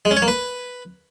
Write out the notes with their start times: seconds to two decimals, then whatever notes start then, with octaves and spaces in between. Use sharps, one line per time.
0.05 G#3
0.11 C#4
0.17 C#5
0.22 A#3
0.28 B4